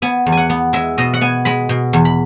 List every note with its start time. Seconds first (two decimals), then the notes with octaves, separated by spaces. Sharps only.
0.02 B3 G#5
0.26 E2
0.32 G#5
0.37 F#5
0.50 B3
0.73 G#3 E5
0.98 B2 D#5
1.14 F#5
1.21 B3 G#5
1.45 G#3 B5
1.69 B2
1.93 E2
2.05 B5